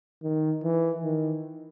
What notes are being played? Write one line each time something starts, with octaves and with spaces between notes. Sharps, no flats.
D#3
E3
D#3